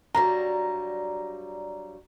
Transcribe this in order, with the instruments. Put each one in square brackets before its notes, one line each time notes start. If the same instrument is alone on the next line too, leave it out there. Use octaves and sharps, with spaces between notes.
[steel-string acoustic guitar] G2 F#3 G3 [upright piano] A#5